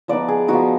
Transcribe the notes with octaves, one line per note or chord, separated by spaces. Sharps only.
F3 B3 D#4 D5
G#4
F3 B3 D#4 F#4